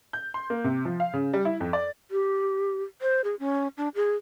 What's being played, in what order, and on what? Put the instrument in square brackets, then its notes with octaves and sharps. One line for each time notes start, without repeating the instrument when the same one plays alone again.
[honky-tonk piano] G6
C6
A#3
C3
F3
F5
C#3
G3
E4
F2
D5
[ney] G4
C5
G#4
C#4
D4
G#4